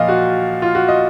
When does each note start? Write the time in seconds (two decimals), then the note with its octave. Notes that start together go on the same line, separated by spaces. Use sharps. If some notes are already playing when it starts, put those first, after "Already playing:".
Already playing: A#2 F3 D#5 F5
0.08 F#4
0.62 F4
0.75 F#4
0.89 D#5